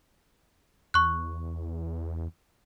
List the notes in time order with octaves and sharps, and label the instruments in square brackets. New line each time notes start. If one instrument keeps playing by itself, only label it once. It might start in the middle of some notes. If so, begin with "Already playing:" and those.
[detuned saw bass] E2 [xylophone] C#6 F#6